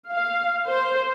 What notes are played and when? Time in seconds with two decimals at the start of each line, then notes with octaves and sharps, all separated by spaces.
0.12 F5
0.68 C5